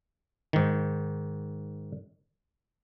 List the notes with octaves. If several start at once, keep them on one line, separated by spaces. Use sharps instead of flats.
G#2 D#3